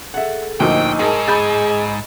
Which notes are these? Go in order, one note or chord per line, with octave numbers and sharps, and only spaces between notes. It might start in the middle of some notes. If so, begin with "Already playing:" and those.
G#4 A4 E5 F#5
D2 A#2 F3 D#4 D#5 G5 C#6 E6
G#2 G#4 A#4 A5
G#4 B5 G6 A6